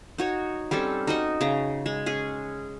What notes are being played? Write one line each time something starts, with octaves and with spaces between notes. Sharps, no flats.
D#4 F#4 C#5
G3 C4 C#4 A4
D#4 F#4 D#5
C#3 A#5
G#3
C#4 G#4